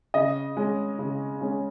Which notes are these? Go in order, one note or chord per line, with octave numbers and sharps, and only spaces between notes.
C#3 D#5
G#3 C#4
C#3
G#3 C#4